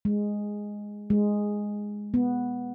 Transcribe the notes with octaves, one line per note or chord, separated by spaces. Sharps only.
G#3
G#3
B3